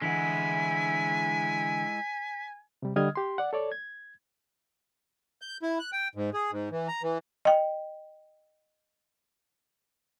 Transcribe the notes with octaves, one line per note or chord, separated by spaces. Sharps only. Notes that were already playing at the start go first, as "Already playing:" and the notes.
D3 E3 G#3 E4 F#5 G#5 B6
C3 G3
D3 G3 D#5 D#6 F6 G#6
G4 C6
D5 F#5
A4 C#5 D5
G#6
G6
E4
F#6
G5
G#2
G#4
G#2
E3
A#5
E3
D#5 G5